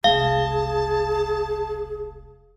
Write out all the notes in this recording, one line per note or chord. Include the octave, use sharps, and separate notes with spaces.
E1 C2 G#4 F5 A5